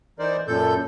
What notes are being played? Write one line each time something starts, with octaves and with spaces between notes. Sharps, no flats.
E3 D#4 A#4 C5 D5
F#2 A#2 A4 G6